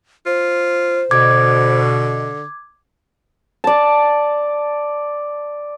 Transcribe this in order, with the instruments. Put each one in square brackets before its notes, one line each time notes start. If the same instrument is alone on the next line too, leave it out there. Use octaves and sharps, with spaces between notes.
[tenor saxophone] F4 [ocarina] C5
[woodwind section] B2 [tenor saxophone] D3 [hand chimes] D6 G#6
[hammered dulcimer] D5 A5